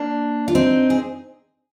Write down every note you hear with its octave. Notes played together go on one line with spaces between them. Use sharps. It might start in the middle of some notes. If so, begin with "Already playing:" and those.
Already playing: A#3 D4
F4
C4 D#4
G#4